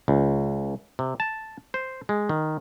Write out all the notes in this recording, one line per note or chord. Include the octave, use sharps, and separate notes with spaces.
C#2
C3
A5
C5
G#3
D#3